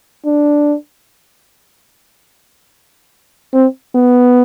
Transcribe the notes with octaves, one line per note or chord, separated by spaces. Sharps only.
D4
C4
B3